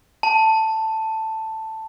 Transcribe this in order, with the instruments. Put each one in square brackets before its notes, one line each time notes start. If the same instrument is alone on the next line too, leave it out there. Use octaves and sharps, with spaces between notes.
[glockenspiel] A5